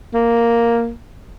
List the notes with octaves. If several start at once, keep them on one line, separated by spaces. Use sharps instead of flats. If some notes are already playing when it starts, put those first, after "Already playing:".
A#3